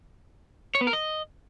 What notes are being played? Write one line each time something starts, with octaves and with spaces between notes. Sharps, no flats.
C#5
B3
A#4
D#5